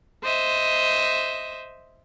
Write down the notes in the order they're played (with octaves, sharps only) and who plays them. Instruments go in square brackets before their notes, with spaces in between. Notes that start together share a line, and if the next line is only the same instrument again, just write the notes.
[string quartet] C5 D#5 E5